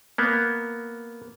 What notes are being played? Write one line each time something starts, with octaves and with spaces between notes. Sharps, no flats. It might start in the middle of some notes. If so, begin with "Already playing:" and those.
A#3 B3